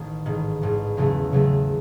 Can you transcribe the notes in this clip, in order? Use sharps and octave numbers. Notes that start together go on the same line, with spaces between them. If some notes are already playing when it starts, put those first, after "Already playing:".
Already playing: A1 D#3
A1 G#2 D#3
A1 G#2 D#3
E2 C#3 F#3 A3
E2 C#3 F#3 A3